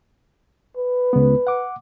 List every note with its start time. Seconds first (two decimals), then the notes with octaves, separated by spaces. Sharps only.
0.77 B4
1.13 C#2 G#3 B3
1.47 F#5 D6